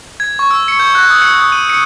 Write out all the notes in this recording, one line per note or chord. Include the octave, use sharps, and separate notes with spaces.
G#6
C#6
E6
C#7
G6
F#6
D#6
C#7
D#6
D#7
C#7